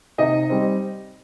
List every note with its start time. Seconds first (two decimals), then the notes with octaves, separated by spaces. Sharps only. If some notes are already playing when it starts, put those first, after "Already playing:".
0.18 C3 D#4 D#5
0.50 G3 C4